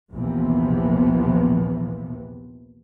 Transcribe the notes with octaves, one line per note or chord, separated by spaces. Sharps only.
A#1 D#2 C3 E3 F3 B3